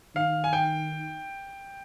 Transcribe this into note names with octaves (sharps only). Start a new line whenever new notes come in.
D#3 F5
G#5
G5